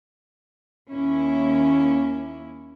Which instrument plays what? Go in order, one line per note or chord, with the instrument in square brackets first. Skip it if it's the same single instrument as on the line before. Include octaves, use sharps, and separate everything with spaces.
[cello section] D#2 A#3 C#4 E4